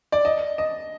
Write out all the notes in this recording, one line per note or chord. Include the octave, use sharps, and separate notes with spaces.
D5
D#5
D#5